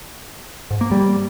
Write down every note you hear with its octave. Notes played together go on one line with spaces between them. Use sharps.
G#2
A#3
G3